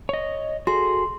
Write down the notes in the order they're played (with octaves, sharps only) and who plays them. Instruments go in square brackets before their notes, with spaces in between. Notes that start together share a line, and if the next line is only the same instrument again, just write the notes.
[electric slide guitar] C#5 D#5
[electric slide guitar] F#4 G#4 A4 [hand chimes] C6